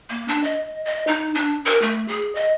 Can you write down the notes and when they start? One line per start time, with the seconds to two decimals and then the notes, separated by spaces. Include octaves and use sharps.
0.10 A#3
0.28 D4
0.44 D#5
0.85 D#5
1.07 D#4
1.35 D4
1.66 A#4
1.82 A3
2.08 G#4
2.35 D#5